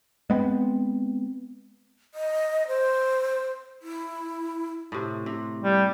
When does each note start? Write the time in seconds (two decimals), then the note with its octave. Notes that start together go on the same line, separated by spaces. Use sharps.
0.30 G#3 B3 C4
2.14 D#5
2.68 C5
3.82 E4
4.92 A2 C3
5.26 C3
5.64 G3